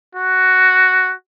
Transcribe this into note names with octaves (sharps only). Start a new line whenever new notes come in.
F#4